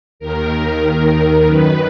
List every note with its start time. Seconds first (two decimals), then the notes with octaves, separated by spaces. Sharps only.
0.20 D#2 D#3 A#4
0.83 D#2 D#3 A#4
1.45 F#2 D#3 B4